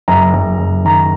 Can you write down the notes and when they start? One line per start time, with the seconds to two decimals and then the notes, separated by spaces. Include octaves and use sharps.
0.08 F#1 A#5
0.34 F#1
0.59 F#1
0.85 D#3 A#5